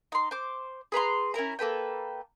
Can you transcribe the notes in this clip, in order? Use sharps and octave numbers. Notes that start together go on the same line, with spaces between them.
D#4 C6
C5 D6
G#4 B4 A#5 C6
C#4 E4 A#4 A#5
A#3 A4 B4 G5